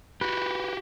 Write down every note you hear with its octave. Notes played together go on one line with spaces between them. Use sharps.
F#4 G4 B4